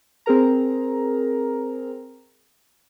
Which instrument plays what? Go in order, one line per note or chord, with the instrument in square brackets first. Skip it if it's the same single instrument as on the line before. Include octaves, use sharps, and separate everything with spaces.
[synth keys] C4 G#4 A#4 A#5